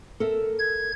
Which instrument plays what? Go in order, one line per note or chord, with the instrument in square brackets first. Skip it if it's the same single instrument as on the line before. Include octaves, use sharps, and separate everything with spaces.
[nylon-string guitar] A4 A#4 E5
[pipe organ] G#6